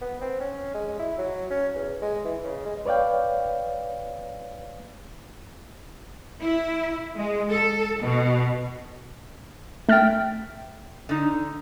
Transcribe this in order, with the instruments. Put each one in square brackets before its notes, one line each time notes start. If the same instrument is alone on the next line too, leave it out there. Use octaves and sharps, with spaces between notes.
[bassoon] B3
C4
C#4
G#3
E4
F#3
C#4
E2
G#3
E3
C#3
G#3
[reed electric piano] B4 C#5 D5 F5 G5
[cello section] E4
G#3
A4
B2
[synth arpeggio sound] A3 F6 A6 [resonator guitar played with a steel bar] E5 G5
[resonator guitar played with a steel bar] D3 D#4